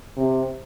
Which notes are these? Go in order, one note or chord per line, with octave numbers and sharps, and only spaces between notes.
C3